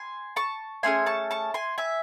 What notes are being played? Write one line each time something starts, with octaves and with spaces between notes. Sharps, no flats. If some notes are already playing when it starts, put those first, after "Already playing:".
Already playing: G#5 C6
A5 C#6
A3 C#4 G#4 G#5 C6
A5 C#6
A5 C#6
G#5 C6
E5 G#5